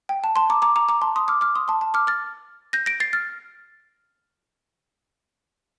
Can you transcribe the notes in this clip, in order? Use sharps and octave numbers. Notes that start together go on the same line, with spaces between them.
G5
A5
A5 C6
A#5 D6
A#5 D6
A#5 D6
A#5 D6
A5 C6
C6 D#6
D6 F6
D6 F6
C6 D#6
A5 C6
A5
D6 F6
F6 A6
G6 A#6
A#6 D7
A6 C7
F6 A6